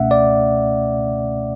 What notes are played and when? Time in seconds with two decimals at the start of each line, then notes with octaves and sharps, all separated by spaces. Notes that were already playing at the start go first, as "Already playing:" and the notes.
Already playing: C#2 B2 A3 C#4 E5 F#5
0.11 D5